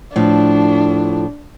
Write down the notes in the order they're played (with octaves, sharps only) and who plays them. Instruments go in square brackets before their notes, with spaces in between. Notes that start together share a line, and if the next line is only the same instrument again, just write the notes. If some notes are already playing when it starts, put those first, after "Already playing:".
[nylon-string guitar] A2 F3 [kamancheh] D4